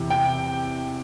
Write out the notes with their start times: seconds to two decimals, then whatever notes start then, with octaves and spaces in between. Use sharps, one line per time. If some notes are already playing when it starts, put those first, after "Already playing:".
Already playing: E2 C3 E3
0.10 G5